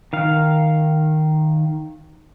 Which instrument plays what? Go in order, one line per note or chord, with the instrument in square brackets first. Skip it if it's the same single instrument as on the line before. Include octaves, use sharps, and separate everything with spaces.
[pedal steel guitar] D#3 F5